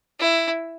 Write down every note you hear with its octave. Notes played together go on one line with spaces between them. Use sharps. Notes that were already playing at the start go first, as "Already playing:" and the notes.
E4